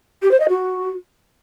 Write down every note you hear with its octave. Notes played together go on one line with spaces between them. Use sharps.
G4
C5
D#5
F#4